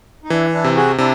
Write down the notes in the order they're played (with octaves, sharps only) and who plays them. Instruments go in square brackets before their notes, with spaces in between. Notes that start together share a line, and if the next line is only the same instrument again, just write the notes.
[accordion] D#4
[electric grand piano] E3 [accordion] D4 E4
[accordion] D4 E4
[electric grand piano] C3
[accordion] F#4 G#4
[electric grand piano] C3 [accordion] D4 E4